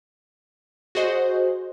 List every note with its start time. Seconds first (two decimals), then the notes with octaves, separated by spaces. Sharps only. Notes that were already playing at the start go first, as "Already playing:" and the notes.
0.95 F#4 G#4 C5 D#5